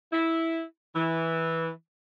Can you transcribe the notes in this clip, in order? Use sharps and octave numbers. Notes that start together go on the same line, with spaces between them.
E4
E3